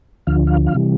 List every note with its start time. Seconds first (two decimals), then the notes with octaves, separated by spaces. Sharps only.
0.27 D2 D3 F3 F5
0.47 F5
0.66 F5
0.75 C3 E3 G3